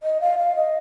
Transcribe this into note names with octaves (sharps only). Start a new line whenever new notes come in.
D#5
F5
F5
D#5